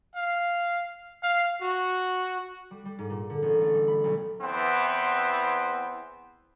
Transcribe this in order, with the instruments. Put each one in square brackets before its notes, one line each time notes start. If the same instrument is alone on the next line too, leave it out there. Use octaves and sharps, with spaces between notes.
[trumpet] F5
F5
F#4
[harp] G3
G3
G#2
A#2
D3
A1
A3
G3
B5
B1
[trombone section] E2 E3 B3 C4